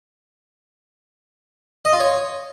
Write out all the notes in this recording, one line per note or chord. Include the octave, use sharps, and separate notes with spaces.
D#5
F4
C#5